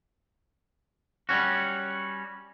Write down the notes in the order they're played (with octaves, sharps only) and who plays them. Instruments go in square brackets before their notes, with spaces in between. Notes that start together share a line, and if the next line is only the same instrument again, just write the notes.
[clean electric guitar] G3 C#4 F#4